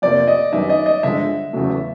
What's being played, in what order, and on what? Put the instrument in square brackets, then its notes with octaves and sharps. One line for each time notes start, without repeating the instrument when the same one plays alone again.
[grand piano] F2 C3 F3 A#3 [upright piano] D5
[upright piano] D#5
[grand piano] F#2 D#3 G3 B3 D#4 [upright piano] E5
[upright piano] D#5
D#5
[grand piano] G2 D3 F3 G#3 [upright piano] E5
[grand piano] E2 C#3 F#3 A3
[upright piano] E5